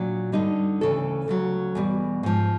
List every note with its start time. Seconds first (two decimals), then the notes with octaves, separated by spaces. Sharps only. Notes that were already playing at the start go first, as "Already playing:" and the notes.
Already playing: A#2 F#3 D4
0.32 G2 D3 G3 D#4
0.81 D2 C#3 E3 A4
1.28 D2 C#3 F#3
1.75 E2 B2 G3
2.23 G#2 F3